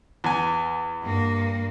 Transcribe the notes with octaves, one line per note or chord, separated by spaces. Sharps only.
E2 G#5
G2 A#3